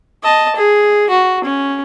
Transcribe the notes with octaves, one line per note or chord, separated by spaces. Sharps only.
D#5 A5
G#4
F#4
C#4